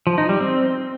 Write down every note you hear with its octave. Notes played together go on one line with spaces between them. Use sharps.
F3
D#4
G3
C4